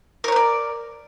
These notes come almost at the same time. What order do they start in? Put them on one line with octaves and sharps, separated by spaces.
A#4 C#5 B4 D5